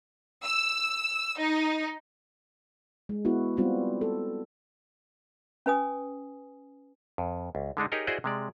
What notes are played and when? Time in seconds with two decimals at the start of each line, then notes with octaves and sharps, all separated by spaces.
0.43 E6
1.38 D#4
3.09 G#3
3.25 B3 E4 F#4
3.57 G3 B3 C4 F4 F#4
4.01 A4
5.66 C#4 B4 G#5 D#6
7.18 F2
7.55 C#2
7.77 D3 G#3 D4 D#4
7.92 D#4 G4 G#4 A#4 C#5 D#5
8.07 E4 F#4 G#4 C5 D5 D#5
8.24 C3 G#3 D5